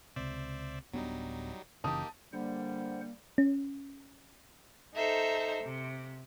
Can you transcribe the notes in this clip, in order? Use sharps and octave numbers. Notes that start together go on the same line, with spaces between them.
C#2 C3 C5 D5 E5
D1 F#3 G3 B3 D4 D#4
F#1 C#3 E3 A#3 D#4 G4 A5 D#6
D3 G3 A#3 C5 F#5
C#4
D#4 A4 C5 E5 A#5
C3